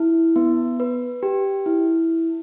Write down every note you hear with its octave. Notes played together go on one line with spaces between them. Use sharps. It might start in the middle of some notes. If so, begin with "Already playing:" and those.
Already playing: E4
B3
B4
G4
E4